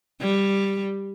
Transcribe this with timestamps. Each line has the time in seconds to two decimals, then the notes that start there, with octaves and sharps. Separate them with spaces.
0.21 G3